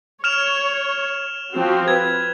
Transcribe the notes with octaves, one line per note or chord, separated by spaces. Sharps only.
C#5 F6 E7 F7
F3 C4 F#4
B4 G#6